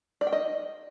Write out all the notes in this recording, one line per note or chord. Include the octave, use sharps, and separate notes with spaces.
D5
G5
D#5